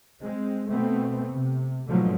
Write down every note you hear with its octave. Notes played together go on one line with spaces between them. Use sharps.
G#3 C4
B2 A3 B3 C4
C3
G#2 B2 D3 F3 F#3 A3